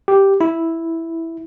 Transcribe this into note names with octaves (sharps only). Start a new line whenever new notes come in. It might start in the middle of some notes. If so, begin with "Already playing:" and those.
G4
E4